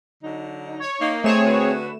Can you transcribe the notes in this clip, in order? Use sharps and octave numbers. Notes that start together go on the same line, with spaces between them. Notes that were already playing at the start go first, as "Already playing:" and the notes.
D3 F#3 D#4
C#5
A#3 D#4
A3 C4 G#4 C#5 E7
D3 F#4 B4